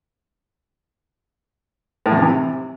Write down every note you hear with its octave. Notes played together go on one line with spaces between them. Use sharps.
A2
E2
C3
E3
C3